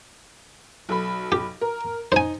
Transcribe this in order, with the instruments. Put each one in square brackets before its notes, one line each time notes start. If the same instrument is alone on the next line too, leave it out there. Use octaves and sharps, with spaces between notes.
[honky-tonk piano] B1 A4 B5
[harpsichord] G4
[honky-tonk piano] A#4
[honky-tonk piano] D#4 [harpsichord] C5 G#5